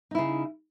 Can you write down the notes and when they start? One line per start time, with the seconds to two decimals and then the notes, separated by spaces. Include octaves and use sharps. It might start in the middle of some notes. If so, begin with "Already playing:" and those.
0.11 D#4
0.15 E4
0.18 C#3